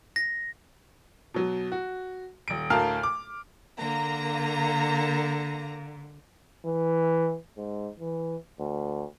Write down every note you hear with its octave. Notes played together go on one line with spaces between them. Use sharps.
A#6
B2 F#3
F#4
D#1 D7
D2 A2 A#4 F5 A5 F6
D6
D3 A#3 A#5
E3
G#2
E3
D2